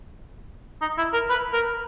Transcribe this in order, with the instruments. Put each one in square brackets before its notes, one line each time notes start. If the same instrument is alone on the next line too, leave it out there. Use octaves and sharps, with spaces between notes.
[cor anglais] D#4
E4
A#4
B4
A#4